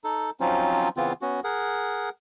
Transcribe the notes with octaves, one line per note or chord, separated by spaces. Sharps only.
D#4 A4
F3 F#3 C4 C#4 D#4 F4
C#3 E3 B3 C4 F4
B3 C#4 F#4
G#4 A#4 F#5